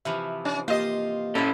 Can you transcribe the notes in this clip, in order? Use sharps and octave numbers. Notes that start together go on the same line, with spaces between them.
C3 E3 F3 E5
C#4
A#3 F4 G4 C5 D#5
C#4 E4 A4 C5